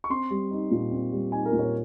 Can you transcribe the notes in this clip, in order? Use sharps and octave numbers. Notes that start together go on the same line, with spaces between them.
C#6
C4 C6
G3
D#4
A#2
C4
G3
D#4 G#5
A#4
A#2
C#5